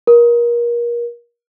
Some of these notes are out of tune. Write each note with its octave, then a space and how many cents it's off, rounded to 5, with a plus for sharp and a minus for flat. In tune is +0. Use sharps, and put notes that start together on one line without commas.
A#4 +30